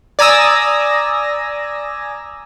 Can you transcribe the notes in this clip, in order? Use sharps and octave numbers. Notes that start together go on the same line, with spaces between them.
D5 G#5 A#5 D#6 E6 A#6